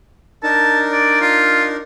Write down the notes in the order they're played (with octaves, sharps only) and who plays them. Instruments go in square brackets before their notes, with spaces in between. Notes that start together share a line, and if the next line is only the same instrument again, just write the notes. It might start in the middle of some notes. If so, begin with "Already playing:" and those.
[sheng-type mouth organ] D4 D#4 A#4 [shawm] A5
[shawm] D5
F4